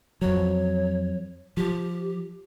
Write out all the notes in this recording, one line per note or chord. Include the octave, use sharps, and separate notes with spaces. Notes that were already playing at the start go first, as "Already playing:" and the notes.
F2 F#3 C#5
F3 G4